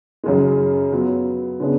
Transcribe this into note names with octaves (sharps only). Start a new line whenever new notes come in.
F#2 C#3 G#3
F#3 B3 F4
C#3 G#3 B3 D4